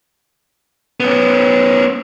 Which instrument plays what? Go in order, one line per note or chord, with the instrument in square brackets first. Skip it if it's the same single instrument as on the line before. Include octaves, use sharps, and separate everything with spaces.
[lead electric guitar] B3 C#4